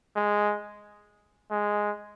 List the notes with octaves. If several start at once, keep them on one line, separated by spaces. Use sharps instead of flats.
G#3
G#3